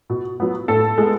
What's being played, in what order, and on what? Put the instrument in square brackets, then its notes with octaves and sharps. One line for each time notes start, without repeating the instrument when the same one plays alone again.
[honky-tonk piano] B2
F#3 B3
A2 A4
G#3 B3